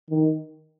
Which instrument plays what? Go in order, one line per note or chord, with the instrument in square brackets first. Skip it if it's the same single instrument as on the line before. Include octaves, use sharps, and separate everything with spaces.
[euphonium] D#3